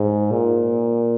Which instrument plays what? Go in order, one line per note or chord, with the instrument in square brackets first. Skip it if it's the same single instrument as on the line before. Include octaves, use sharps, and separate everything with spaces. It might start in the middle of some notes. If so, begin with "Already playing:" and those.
Already playing: [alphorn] G#2
A#2